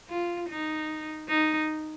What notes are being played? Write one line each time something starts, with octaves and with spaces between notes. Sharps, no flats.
F4
D#4
D#4